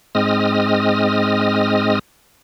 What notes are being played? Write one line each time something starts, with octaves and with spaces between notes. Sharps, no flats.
G#2 G#3 C4 D#5 D#6 F6